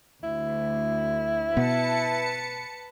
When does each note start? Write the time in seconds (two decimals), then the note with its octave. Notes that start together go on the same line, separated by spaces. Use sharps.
0.23 D2 E4
1.57 B2 B3 B4 A5 C#7